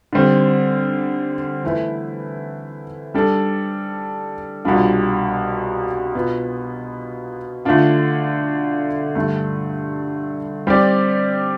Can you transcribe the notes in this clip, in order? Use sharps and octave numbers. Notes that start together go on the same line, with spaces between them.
D3 G3 C4
E3 A3 E4 B4
G3 D4 A4
C2 B2 G3 D4 F4
B2 B3 F4
D3 A3 D4 F4
G2 D3 A3 D4
G3 C4 G4 D5